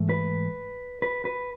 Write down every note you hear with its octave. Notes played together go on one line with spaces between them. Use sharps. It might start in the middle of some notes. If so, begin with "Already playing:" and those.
Already playing: G#2 E3 A3
B4
B4
B4